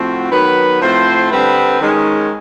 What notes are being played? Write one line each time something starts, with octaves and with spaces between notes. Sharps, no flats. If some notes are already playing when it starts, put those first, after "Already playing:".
Already playing: A2 F3 A3 C4 F#4
D#3 F#3 B3 B4
A2 F3 A3 C4 C5
D3 G3 C4 B4
D#3 G#3 C#4